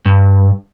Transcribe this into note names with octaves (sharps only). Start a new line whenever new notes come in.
G2